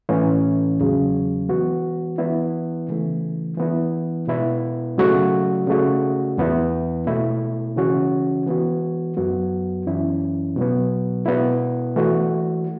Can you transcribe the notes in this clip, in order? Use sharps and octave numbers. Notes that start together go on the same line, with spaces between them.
A2 E3 A3 C#4
E2 C#3 F#3
E3 B3 F#4
E3 B3 E4
C#3 E3 A3
E3 B3 E4
B2 B3 E4
C#3 F#3 A3 F#4
C#3 A3 F#4
E2 E3 B3 E4
B2 A3 E4
C#3 E3 C#4 F#4
E3 B3 F#4
F#2 F#3 B3 F#4
F#2 E3 C#4 E4
B2 F#3 B3
B2 B3 E4
E3 A3 F#4